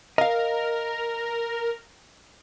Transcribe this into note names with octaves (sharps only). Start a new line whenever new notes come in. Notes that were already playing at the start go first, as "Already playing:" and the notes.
A#4 D#5 F5